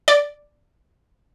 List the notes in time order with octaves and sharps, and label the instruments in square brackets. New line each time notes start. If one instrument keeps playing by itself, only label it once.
[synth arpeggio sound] D5